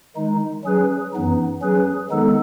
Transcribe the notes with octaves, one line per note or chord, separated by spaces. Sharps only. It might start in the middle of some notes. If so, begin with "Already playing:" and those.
D#3 G#3 D#4
F#3 C#4 G#4 B4
F#2 E3 B3 D#4
F#3 C#4 G#4 B4
D#3 G#3 B3 D#4 A4